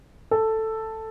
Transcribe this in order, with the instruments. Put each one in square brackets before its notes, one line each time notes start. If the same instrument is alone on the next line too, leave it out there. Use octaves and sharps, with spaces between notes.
[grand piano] A4